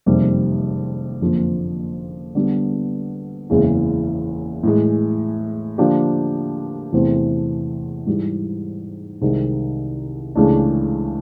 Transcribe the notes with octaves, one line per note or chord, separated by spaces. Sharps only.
F#1 F2 C3 D#3 G3
F#1 F2 D3 F3 A#3
D3 G3 B3
F#1 E2 C#3 E3 G#3
A2 E3 G#3
D3 F3 A#3 D4 G4
E2 C3 E3 A3 C4
G#2 E3 G3
C2 C3 D#3 G#3
C#2 C#3 E3 A3 D4